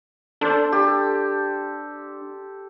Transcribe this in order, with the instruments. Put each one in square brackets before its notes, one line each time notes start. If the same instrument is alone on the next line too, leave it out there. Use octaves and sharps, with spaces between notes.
[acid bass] D4 [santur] A4 C5
[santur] G4 A4